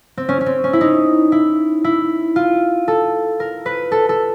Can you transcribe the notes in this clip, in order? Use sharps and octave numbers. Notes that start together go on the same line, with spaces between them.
C4
C#4
C#4
C4
C#4
E4
D#4
E4
E4
F4
A4
A#4
B4
A4
A4